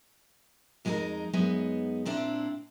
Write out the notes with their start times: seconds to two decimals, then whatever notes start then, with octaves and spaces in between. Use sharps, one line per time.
0.85 F2 G#3 D#4 G4 A#4
1.33 F#2 G#3 B3 D#4
2.05 A#2 C4 D4 E4 C5